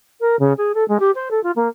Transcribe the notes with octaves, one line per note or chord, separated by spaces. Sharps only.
A#4
C#3
G#4
A4
G#3
G4
C5
A4
F4
A#3